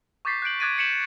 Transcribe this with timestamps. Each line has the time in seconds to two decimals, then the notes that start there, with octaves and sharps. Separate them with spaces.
0.25 C#6 D6 G6 A6 B6 C7
0.42 F#6 G6 D7 F#7
0.60 D6 F#6 G#6 A6 D7 D#7
0.78 B6 C#7 D7 E7 F#7